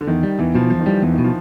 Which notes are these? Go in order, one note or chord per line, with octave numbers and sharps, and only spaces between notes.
D3
E2 D#3
G3
E2 E3
B2 F3
E2 F3
D#3
E3 G3
E2 E3
D#3
B2
F3